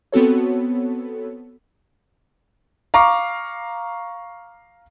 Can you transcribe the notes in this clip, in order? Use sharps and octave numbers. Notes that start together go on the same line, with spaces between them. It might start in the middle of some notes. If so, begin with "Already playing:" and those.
B3 C4 F#4 A4 C#5
F5 A#5 C#6 D6